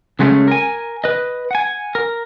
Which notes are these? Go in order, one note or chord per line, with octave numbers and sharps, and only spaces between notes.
C#3 F#3 G#3 A3 C4 C#4
A#4 G#5
B4 D#5
F#5 G#5
A#4